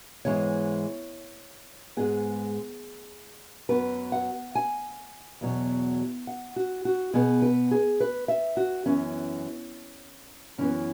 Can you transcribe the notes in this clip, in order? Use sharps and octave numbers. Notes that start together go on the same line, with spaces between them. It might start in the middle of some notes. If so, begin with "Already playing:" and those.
G#2 E3 G#3 B3 C#5
G#2 G#3 B3 G#4
F#2 F#3 B3 B4
F#5
G#5
E2 B2 F#3
F#5
F#4
F#4
B2 B3 G#4
B4
G#4
B4
E5
F#4
F#2 E3 B3 C#4
F#2 E3 B3 C#4